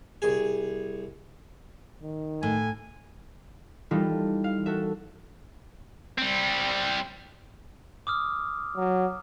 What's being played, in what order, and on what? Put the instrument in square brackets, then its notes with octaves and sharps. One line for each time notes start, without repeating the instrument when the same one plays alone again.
[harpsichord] C2 G#4
[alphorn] D#3
[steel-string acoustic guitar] A2 [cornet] G#5
[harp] E3 G3 D#4 F4 A4
F5
F#4 A4 E5
[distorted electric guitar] G3 C4
[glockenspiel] D6 D#6 F6
[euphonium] F#3